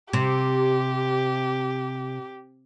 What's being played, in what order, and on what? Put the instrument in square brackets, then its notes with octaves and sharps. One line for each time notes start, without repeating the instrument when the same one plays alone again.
[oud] C3 [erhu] G4